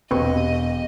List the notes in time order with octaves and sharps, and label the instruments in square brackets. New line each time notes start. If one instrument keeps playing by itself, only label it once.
[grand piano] E1 G4 [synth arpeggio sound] B3 C4 C#6 [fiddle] D#5